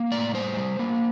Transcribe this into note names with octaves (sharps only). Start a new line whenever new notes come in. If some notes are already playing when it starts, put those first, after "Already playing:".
Already playing: A#3
A2 D5
G3 C5
G3
A#3